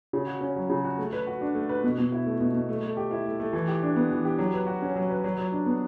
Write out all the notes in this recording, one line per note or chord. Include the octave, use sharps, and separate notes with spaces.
C#3
F#4
C#4
F#3
C#3
F#4
A3
B4
F#4
D4
A3
B4
B2
B2
E4
A3
B2
B2
A3
A3
G4
E4
A3
A3
E3
G4
D4
B3
E3
G4
F#3
B4
F#4
C#4
F#3
B4
F#3
F#3
D4
B3